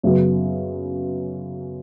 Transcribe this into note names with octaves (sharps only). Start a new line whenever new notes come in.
F#2 C#3 F#3 B3